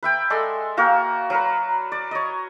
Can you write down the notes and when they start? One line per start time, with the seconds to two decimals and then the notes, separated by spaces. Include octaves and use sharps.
0.03 B4 E5 G5
0.30 G#3 A4 D5 C6
0.77 A#3 F#4 A#4 G5
1.30 F#3 A#4 B4
1.92 D5
2.11 C#5 D#5